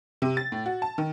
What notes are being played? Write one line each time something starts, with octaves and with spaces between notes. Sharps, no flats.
C3
A6
A2
F#4
A5
D#3